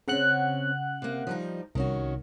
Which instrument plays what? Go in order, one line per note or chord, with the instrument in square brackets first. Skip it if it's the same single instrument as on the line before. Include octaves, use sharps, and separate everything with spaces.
[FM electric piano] C#3 F#5 F#6 [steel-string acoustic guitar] C4 C#4
[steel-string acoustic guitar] C3 A#3
F3 G3 D#4
[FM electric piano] C2 [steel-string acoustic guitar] D#3 C#4 F#4